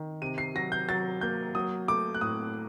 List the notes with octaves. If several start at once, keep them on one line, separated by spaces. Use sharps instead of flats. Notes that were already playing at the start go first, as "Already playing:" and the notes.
Already playing: D#3
C3 D#7
C7
F#3 A#6
G6
F#3 A6
A#3 G6
F#3 D#6
A3 D6
F#6
A2 D#6